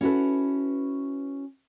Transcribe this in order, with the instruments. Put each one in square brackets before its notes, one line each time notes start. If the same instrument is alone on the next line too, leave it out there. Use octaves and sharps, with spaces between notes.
[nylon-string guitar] C#4 E4 F#4 G4 A4 B4